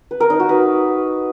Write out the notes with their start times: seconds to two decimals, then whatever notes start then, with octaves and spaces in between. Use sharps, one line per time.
0.11 B4
0.20 A#4
0.30 D#4
0.40 F#4
0.49 B4